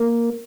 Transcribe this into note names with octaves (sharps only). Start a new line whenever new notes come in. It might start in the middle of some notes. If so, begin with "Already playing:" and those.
Already playing: A#3